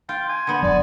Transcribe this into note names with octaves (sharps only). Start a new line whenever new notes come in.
F4 G5
G#5
D3 B3
D#1 F#2 F#3 D5